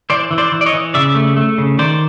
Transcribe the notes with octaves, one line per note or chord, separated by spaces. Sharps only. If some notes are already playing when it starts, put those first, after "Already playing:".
E3 C5 D5
E3
C5 D5
E3
D5
C#5 D#5
E3
C#3 D5 E5
A3
A3
C#3
D#3 C5 D5